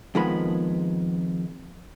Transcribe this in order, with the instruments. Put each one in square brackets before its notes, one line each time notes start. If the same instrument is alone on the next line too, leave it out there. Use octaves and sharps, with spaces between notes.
[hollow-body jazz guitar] F2 D#3 F3 G#3 B3 B5